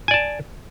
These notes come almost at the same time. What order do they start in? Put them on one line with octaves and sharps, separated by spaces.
G#5 D5 A5